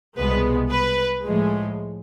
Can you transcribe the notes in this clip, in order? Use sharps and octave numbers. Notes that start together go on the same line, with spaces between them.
C2 B2 G#3 B3 B4
B4
A2 F3 G#3